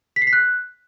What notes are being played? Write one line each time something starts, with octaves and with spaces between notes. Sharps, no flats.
B6
C7
B6
F#6